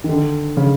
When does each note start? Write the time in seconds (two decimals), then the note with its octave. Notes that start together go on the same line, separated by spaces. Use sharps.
0.04 D#3
0.09 D3
0.57 C#3